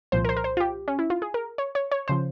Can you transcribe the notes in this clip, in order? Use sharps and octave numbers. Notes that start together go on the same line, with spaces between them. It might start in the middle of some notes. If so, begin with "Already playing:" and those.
C2 A#2 F3 C5
A#4
C5
A#4
C5
F4
G4
C#4
E4
F4
G#4
A#4
C#5
C#5
C#5
C#3 F3 C5